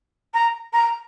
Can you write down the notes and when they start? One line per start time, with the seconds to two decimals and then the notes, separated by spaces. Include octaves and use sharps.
0.33 A#5
0.73 A#5